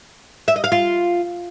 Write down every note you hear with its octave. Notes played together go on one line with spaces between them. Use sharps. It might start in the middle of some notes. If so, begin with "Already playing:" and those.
E5
D#5
F5
F4